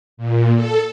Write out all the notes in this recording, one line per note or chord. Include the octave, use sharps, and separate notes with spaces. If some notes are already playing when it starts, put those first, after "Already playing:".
A#2
A4